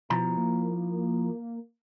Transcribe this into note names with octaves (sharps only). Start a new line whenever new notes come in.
B2 F3 E4 A#5
A#3